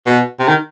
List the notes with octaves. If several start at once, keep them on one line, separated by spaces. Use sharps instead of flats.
B2
C3
D#3